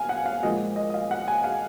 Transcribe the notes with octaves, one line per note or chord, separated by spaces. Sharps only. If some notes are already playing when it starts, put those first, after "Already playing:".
Already playing: F5 G#5
F#5
F5
A#2 F3 G#3 D#5
D#5
D#5
F5
F#5
G#5
F5